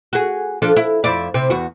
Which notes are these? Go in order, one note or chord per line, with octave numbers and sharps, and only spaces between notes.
F#4 G#4
F3 D4 A4
E4
F2 E4 D5
C3 C4
E2 F#4